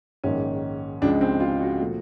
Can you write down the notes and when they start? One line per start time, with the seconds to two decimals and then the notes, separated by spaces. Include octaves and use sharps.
0.24 A#1 G#2 D#3 C#4
1.02 C#2 C#3 F3 G#3 D4
1.21 C4
1.40 F4
1.61 F#4
1.80 A#2 F3 A3